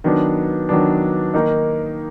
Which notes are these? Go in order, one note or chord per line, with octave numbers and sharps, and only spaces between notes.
D#3 F#3 B3 D4
D#3 F#3 B3 D4
D#3 A#3 D#4